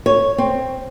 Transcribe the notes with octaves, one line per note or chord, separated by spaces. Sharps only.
C#5
C4